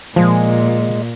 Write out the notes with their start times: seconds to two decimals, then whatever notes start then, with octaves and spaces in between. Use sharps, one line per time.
0.16 A#2 F3 G#3